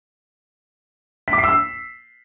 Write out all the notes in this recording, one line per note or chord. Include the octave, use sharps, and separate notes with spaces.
B6
D6
C7
E6